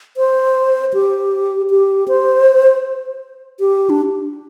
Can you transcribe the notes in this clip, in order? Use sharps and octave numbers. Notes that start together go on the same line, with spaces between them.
C5
G4
G4
C5
G4
D4